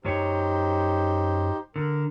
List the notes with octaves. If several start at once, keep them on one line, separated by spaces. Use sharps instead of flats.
F#2 F#3 D#4 G4 C5 C#5
D3 A#4